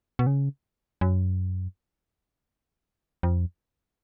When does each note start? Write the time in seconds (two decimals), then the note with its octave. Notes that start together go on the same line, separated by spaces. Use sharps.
0.19 B2
0.27 C#3
1.01 F#2
3.23 F2